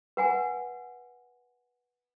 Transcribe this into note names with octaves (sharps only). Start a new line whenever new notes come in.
B4 F#5 G#5